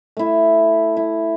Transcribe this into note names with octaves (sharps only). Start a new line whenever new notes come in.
A3 E4
E4